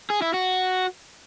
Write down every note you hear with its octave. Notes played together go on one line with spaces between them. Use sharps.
G#4
E4
F#4